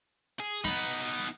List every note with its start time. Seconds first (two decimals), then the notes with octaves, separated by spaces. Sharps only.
0.40 G#4
0.64 B3 D#4 B5